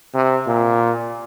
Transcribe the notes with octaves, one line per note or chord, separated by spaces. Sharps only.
C3
A#2